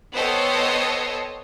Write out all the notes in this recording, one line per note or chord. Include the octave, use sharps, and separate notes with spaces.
B3 A4 C5 C#5 D#5 G5